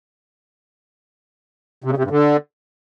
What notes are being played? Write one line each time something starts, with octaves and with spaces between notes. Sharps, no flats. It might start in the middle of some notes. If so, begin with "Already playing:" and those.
C3
C#3
C3
G2
D3